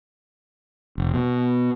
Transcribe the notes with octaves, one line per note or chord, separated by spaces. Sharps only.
F1
B2